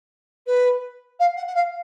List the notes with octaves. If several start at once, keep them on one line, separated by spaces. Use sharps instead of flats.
B4
F5
F#5
F#5
F5